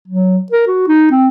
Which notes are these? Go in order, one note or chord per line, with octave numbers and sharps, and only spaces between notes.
F#3
A#4
F#4
D#4
C4